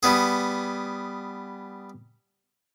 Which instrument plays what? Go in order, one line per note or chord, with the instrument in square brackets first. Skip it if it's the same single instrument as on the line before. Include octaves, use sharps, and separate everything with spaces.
[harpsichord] G3 B3 G#4